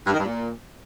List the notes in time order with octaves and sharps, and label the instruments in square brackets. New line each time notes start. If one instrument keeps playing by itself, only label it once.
[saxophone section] G2
D#3
G2
A#2